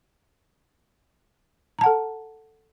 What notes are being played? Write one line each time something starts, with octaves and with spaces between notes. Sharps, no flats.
A4 F#5 A5 A#5